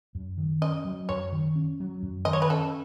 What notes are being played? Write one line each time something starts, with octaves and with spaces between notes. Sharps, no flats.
F#2
D#3
C#4 D#5
F#3
F#2 C#5
D#3
C#4
F#3
F#2
D#3 D#5
C#5
B4
C#4 A4